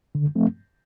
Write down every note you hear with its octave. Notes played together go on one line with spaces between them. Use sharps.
D3
F3 A3 C4